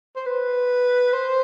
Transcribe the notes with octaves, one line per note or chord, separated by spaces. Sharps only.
C5
B4
C5